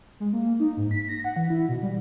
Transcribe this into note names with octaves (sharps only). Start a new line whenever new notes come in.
G#3
A#3
D#4
G#2
B6
A#6
F#5
E3
E4
B2
G3